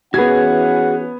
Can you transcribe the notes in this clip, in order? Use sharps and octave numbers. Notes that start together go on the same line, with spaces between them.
E3 B3 C#4 F#4 G#4 F#5 G#6